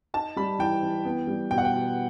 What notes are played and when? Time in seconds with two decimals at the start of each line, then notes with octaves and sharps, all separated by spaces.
0.14 D#4 A5
0.36 G3 B5
0.59 E3 G5
0.83 E3
1.05 B3
1.27 G3
1.51 B2 G5
1.58 F#5
1.65 G5
1.73 B2